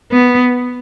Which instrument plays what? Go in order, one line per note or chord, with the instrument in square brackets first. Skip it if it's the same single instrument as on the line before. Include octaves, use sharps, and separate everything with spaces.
[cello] B3